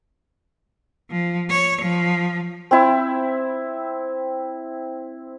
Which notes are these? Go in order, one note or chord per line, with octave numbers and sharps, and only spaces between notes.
F3
C#5
F3
C4 E4